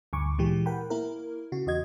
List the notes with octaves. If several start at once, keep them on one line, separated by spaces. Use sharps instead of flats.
D2 G2 G#5 C#6 D6
A#2 E3 G#3 G4
A#4 F#5 G5 B5
A#3 E4 A#4
C#3 F#4
E2 F#4 D#5 G#6